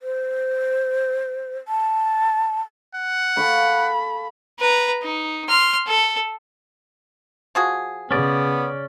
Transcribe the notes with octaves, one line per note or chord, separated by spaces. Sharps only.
C5
A5
F#5
A4 F5 B5 C#6
B4 A#5
D#4
C6 F6
A4
F3 F#4 G#4
C#3 B3 C#4 D5